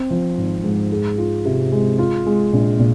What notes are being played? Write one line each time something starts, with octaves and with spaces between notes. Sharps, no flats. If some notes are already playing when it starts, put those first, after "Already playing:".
Already playing: C4
F3
G#1
G#2
G#4
F4
C3
G#3
F4
G#3
A#1
A#2